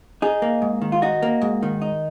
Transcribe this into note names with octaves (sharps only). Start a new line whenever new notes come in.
D#4 G#4
A#3
G#2
D#3
F4
D#4 F#4
A#3
G#2
D#3
D#4